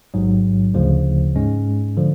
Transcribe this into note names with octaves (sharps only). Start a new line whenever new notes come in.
A1 G#2 F#3
D2 C#3 F3
G#2 G#3 C#4
D3 F3